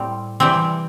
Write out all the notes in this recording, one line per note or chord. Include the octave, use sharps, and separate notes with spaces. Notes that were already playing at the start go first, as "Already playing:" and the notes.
Already playing: A2 G3 C4
C3 E3 G3 C4